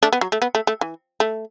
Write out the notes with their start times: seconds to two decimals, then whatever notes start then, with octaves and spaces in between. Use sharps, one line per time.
0.03 A3 D4
0.13 B3
0.21 F#3
0.32 A3
0.42 B3
0.55 A3
0.67 A3
0.81 E3
1.20 A3